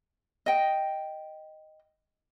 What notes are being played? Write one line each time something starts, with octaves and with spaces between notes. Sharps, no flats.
D#5 G5